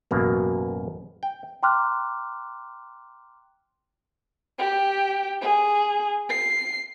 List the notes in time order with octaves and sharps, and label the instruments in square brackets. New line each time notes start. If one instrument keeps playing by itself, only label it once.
[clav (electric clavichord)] A1 F#2 B2 A#3
G5
[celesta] G5 A#5 C6 D6 F6 F#6
[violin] G4
G#4
C7